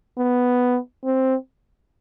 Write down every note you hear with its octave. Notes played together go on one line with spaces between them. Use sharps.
B3
C4